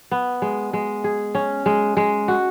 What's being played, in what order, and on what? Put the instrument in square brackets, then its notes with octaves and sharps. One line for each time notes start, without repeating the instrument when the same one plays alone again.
[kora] B3
G#3
G#3
G#4
C#4
G#3
G#3
F#4